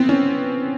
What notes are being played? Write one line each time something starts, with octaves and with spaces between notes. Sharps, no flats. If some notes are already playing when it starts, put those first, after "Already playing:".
Already playing: B3 C4
C#4